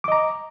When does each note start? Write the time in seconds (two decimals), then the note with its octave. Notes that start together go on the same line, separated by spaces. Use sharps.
0.04 D6
0.08 D#5
0.12 A#5